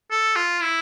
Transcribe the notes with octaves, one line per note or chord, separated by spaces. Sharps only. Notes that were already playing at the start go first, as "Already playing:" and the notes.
A4
F4
E4